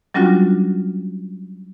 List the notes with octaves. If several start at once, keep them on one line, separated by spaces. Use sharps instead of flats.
F#3 G3 C#4 D4 F4 F#4